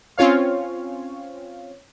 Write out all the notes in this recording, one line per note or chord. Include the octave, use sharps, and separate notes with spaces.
C4 C#4 F4 C#5 F5